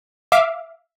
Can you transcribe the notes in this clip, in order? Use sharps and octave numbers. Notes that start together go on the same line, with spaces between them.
E5 F5 D6